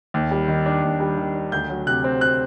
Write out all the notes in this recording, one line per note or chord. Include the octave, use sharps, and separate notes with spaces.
D#2
G3
D#3
D4
D#2
G3
D#3
D4
D2 G6
F#3
C3 F#6
C4
F#6